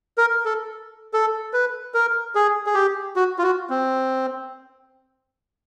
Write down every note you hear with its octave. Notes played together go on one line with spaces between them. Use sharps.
A#4
A4
A4
B4
A#4
G#4
G#4
G4
F#4
F4
F#4
C4